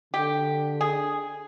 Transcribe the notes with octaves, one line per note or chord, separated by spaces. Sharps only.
D3 G4
G#4